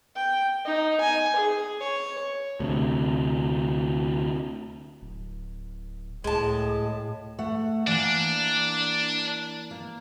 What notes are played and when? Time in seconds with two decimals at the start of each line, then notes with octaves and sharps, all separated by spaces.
0.16 G5
0.65 D#4
1.00 G#5
1.36 G#4
1.81 C#5
2.60 D2 C3
5.02 D1
6.24 C#2 A2 G#3 A5
7.39 A3 F#5
7.87 E3 A#3 D4
9.71 A#3